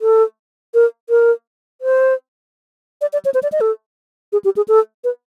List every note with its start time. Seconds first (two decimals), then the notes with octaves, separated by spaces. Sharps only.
0.01 A4
0.74 A#4
1.10 A#4
1.81 C5
3.01 D5
3.13 D5
3.25 C#5
3.34 C5
3.43 D5
3.52 D#5
3.61 A4
4.33 G#4
4.45 G4
4.57 G#4
4.68 A4
5.04 B4